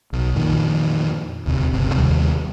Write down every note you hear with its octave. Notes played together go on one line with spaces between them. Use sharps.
B1
F2 A#2 D#3
D#1 D2 C3
G1 C#2 C3
D#2 C3 D#3 G3